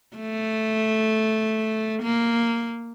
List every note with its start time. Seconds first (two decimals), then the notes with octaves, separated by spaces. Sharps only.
0.16 A3
2.02 A#3